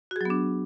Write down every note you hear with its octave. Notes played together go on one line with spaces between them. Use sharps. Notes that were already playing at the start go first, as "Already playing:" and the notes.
F#3 B3 D4 F#4 G#4